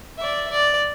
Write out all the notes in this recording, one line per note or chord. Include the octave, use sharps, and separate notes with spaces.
D5 E5
D5